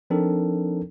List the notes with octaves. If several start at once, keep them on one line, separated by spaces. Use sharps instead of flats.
F3 C4 D4 D#4 A4 A#4